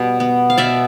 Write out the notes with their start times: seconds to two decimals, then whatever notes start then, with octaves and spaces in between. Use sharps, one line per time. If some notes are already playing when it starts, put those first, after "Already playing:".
Already playing: B2 G3
0.20 B3
0.50 F5
0.58 B2 D5 E5